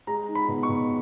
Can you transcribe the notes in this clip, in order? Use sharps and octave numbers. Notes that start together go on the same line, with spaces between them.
G#3 A#5
D#4
B5
B2
C#6
B2